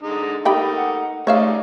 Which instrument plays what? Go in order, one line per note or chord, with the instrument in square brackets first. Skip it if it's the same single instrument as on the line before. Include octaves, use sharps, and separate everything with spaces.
[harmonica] D3 G#3 D#4
[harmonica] A3 A#3 D#4 [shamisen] G4 G5 B5
[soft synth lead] F#5
[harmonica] G3 C#4 D#4 [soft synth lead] A3 [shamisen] C#5 E5 F5